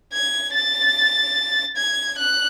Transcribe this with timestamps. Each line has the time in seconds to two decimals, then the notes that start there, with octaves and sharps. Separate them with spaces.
0.13 G#6
0.54 A6
1.77 G#6
2.19 F#6